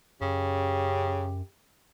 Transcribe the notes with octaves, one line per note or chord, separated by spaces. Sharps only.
F#2 C#3 G4